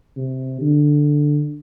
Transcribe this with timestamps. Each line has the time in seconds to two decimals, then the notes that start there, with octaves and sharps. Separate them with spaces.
0.17 C3
0.61 D3